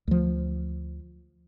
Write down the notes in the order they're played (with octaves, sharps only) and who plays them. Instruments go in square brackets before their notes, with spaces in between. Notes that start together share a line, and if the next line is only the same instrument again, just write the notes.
[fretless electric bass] D2 F3